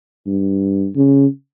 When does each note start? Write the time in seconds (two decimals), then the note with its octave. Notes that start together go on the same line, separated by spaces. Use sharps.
0.27 G2
0.95 C#3